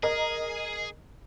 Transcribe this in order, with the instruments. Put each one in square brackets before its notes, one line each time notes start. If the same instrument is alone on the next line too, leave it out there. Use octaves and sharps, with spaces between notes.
[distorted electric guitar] G#4 [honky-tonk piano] A#4 D#5 A#5